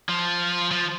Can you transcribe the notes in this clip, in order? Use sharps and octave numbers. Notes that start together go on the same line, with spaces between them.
F3
F3